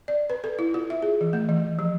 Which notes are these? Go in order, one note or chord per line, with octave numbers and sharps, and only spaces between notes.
D5
B4
A4
E4
F4
E5
G#4
E3
A3
E3
F3